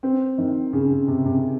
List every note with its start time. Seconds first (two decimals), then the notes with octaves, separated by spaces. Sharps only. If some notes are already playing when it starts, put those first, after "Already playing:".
0.03 C4
0.38 D#3
0.73 C#3
0.90 C#3
1.08 C3
1.25 C3